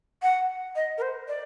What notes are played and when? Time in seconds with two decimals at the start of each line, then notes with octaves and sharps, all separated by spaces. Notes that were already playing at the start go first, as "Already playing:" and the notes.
0.22 F#5
0.76 D#5
0.98 A#4
1.02 C5
1.28 D5